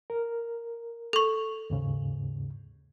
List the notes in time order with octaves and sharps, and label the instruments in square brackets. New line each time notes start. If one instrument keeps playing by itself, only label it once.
[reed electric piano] A#4
[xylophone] A4 C#6
[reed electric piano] D#2 G#2 C#3